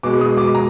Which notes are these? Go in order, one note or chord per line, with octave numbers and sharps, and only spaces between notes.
B2 G#3 D6
D#6
D6
A#5